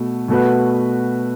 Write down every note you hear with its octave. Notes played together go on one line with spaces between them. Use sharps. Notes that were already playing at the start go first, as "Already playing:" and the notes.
Already playing: B2 A3 F#4
B2 A3 F#4 B4